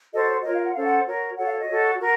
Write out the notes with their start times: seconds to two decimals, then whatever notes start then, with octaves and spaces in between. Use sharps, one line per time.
0.12 F#4 A4 C5 D#5
0.28 C#5
0.44 F4 A#4 C#5 D#5
0.54 F5
0.64 F#5
0.74 C#4 A4 C5 F5
0.84 F#5
1.06 F#4 A#4 C#5
1.36 F#4 A4 C#5 F#5
1.46 F5
1.57 D#5
1.67 F#4 A4 C#5
1.98 F#4 A#4